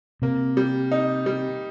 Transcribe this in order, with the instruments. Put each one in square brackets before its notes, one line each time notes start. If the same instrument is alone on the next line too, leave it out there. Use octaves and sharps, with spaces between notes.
[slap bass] C3 [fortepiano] A#3
[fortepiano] G3
D#4
G3